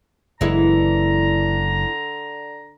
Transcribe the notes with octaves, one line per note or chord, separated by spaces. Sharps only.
F#1 D3 E3 G#3 E4 A#5